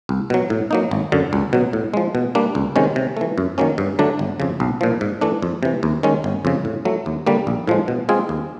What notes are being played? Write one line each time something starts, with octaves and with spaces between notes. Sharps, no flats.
C2
B2 F#3
A2
F#3 A#3 D#4
G#1
F#2 D3
C#2
B2 F#3
A2
F3 G#3
B2
G3 A#3 D4
C#2
C3 D#3 G#3 C#4
C3
E3 A3
F#2
D#3 F#3 A#3 C#4
G2
D3 F#3 A3 D4
G1
F2 C#3
B1
A#2 F3
G#2
E3 A3 D4
F2
C3 E3
D#2
D#3 G#3 C#4
G1
F2 C#3
A2
F#3 A3
D#2
D3 G3 A#3
A#1
A2 F3 G#3
B2
G#3 C4 F4 G#4
D#2